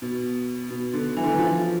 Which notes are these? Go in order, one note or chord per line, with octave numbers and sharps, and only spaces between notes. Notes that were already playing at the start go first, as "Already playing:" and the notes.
B2
B2
D3
E3
D3
E3
F3